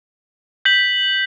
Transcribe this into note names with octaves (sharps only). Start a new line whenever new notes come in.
G6 B6 F#7